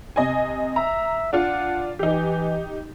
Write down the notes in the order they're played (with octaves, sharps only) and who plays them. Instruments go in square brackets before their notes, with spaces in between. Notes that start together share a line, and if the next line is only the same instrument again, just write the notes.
[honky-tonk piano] C3 D#5 G#5
[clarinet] E5 [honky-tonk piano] A#5
[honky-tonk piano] D4 F4 [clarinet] F#5
[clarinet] E3 [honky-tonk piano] D#4 G4